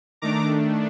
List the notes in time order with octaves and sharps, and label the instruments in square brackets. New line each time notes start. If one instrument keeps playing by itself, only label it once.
[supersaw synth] D#3 A3 D4 A#5 D6